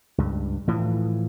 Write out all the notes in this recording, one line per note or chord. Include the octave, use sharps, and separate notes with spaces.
C#2 G2
A2 E3 F3